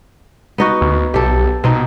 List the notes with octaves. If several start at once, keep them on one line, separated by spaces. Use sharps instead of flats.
B3 D#4 F#4
D2
B1 G4 A4
B2 C4 D#4